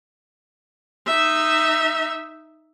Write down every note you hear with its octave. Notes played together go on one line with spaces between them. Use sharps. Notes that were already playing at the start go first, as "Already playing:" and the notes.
D#4 E5